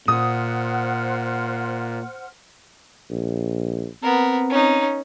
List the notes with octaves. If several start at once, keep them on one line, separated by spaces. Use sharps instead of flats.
A#2 C5 F#5 D#6 F6
A#1
B3 C4 A#4
C#4 D#4